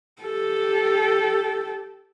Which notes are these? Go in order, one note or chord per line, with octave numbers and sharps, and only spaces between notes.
G4 A4